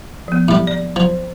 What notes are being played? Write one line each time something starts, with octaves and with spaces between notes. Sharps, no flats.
F3 B3
A2 G3
D5
F3 C5